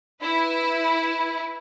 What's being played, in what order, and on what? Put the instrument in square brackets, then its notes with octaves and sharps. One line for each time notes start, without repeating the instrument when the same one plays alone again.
[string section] E4 B4